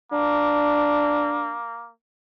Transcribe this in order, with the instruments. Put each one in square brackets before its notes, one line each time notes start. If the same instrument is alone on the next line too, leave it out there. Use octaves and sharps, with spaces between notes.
[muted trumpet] A#3 [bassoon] D4